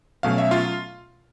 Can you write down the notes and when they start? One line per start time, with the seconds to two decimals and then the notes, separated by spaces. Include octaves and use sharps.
0.23 B2 F#3 A3 C#4 F5
0.38 E5
0.51 F4 F5